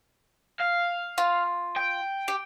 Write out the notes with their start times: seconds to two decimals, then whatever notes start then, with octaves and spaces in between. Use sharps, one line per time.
0.60 F5
1.18 F4
1.76 G5
2.28 G4